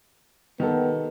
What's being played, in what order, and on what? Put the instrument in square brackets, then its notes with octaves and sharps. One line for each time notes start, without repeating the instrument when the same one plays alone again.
[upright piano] D#3 G4 A4 [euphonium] B3